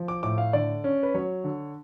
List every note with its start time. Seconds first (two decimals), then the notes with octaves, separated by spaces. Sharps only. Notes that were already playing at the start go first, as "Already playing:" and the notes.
Already playing: F3
0.08 D6
0.23 A2 D6
0.38 F5
0.53 D3 D5
0.84 C#4
1.03 B4
1.15 F#3 C#5
1.44 D3